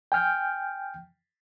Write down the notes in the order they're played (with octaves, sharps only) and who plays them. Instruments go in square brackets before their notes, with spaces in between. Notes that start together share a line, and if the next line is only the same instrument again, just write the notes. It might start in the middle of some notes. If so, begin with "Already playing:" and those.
[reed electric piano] G5 G#5 F6 G6